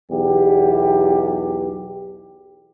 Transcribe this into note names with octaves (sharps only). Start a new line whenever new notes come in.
B1 E2 G4